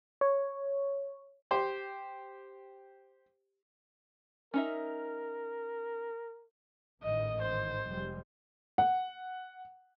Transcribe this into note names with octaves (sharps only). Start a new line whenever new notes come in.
C#5
G4 C5
C#4 D#4 A#4 E5
A1 G#2 D#3 D#5
C5
F1 G3 G#3
F#5